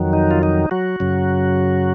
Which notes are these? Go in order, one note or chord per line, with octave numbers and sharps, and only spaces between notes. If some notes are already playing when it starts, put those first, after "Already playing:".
Already playing: F2 D#3 F#3
D#4
F4
D#4
F#3 F#4
F#2 C#3 F#3